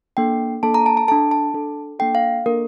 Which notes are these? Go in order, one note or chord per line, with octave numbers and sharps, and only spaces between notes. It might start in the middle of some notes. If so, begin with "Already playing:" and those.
A#3 D4 A4 G5
A#3 D4 A4 A5
A#5
A5
A5
D4 A4 A5
A5
D4 A4
A#3 D4 A4 G5
F5
A#3 D4 A4 A#4